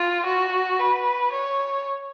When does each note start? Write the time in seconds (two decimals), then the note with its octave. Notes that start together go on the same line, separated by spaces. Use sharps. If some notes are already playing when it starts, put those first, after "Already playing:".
Already playing: F4
0.26 F#4
0.79 B4
1.32 C#5